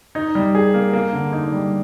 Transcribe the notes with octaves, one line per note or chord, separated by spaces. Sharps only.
D#4
G3
G#4
A#3
A#3
D3
D#4
G3